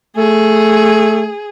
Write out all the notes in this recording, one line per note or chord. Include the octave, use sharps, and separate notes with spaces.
A3 G#4